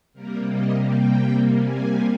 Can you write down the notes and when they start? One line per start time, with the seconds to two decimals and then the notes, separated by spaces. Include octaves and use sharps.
0.13 C3 G3 A#3 A#4
0.49 D#5
0.83 G5
1.54 G#5